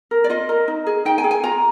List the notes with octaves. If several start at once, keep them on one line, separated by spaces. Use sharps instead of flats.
A#4
D5
F4 D#5
A#4
D#4
G#4
D#4 G5
G#5
G#4
G#5
F4 A#5